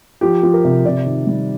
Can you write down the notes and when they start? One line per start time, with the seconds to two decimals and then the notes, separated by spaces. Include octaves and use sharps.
0.21 F3 G4
0.43 F3
0.54 A#4
0.64 C3
0.85 C3 D5
1.06 D#3
1.27 G3